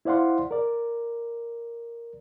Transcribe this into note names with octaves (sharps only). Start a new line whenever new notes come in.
E4 C5 D5 F5 F#5 C6
A#4 D5